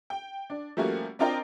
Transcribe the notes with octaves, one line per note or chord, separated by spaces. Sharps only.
G5
D4
F3 G3 A3 A#3 C#4 F#4
C4 D4 F4 A#4 D#5 G5